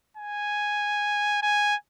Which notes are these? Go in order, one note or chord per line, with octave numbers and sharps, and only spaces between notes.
G#5
G#5